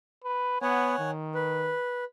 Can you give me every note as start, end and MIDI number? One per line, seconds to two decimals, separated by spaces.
0.24 0.60 71
0.62 0.97 59
0.62 1.11 73
0.62 1.11 78
0.62 1.11 80
0.99 1.75 51
1.35 2.04 71